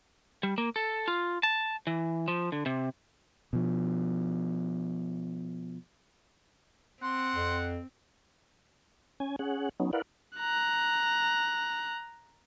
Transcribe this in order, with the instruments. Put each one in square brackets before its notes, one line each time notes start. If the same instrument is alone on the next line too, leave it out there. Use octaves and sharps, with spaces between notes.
[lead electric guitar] G3
A#3
A4
F4
A5
E3
F3
D3
C3
[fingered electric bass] B2 F3
[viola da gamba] C4 [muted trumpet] F#5 [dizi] C6
[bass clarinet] F2
[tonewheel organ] C#4 G#5
C#4 G#4 F#5
F#3 B3 C#4 D#4
E4 A#4 B4 D5 F5 F#5
[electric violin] A#5 F#6